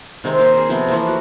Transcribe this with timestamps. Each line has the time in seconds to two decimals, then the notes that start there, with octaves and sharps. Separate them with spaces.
0.24 C3 D#3 G#3 C4
0.39 A#3 A#4 F5
0.54 G#4 C5
0.69 C3 F3 B3
0.88 E3 F3 A3 A#3
1.07 F#4